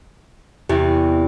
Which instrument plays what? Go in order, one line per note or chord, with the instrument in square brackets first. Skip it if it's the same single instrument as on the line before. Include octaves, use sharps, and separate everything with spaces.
[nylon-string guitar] E2 C3 E3 [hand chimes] G4